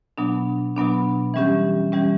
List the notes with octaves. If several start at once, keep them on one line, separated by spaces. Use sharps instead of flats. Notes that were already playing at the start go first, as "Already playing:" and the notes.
B2 F#3 B3 D4
B2 F#3 B3 D4
E3 G3 C#4 G4
E3 G3 C#4 G4